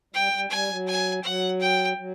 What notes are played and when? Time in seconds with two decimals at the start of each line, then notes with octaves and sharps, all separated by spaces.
0.14 G3 G5
0.32 G3
0.50 G3 G#5
0.69 F#3
0.87 G#5
1.24 F#3 F#5
1.60 G5
1.97 F#3